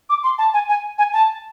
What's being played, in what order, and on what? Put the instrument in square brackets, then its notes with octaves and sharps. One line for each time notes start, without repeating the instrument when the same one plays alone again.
[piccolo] D6
C6
A5
G#5
G#5
G#5
A5